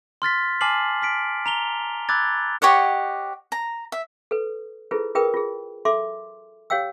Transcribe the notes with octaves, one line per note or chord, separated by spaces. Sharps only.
C6 F6 A6 B6
G#5 A5 D6 F6 C7 F#7
F6 B6 D7
A#5 F7 G7
B5 D6 E6 F#6 G#6 A6
G4 C#5 D#5 F#5
A#5
E5
A4 B4
E4 F4 G#4 A4 B4 C5
F4 G#4 A#4 B4 G5 D#6
F4 G#4
A4 E5 C6 D6
G4 C#5 F5 G5 E6